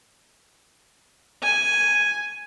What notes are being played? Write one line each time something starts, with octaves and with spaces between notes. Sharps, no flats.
G#5